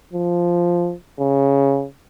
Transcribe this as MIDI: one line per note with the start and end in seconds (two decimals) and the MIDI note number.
0.13 0.94 53
1.19 1.85 49